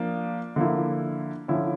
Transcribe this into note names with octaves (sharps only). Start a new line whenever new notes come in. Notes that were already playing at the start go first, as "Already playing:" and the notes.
Already playing: F3 A#3 D4
D3 F3 A#3 E4
D3 F3 C#4 E4